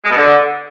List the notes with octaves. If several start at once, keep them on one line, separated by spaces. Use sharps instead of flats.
G#3
B2
D3